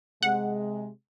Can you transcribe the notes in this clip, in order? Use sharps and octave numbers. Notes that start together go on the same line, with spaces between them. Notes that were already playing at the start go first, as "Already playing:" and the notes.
C3 G#3 F#5